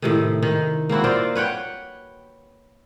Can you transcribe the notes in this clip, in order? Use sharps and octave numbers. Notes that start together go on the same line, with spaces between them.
A2 C3 D#3
D#3
A#3 C4 E4 F#4
F4 A#4 C5 D5
B4 C#5 F#5 G5